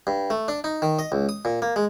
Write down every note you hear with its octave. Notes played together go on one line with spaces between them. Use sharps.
G2
A3
D4
D#4
D#3
D#5
C#2
D#6
A#2
A#3
G#3